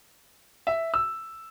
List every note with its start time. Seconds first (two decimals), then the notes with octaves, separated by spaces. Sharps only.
0.67 E5
0.94 E6